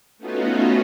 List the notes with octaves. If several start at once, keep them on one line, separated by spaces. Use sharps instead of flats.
A3 B3 C#4 D#4 F4 F#4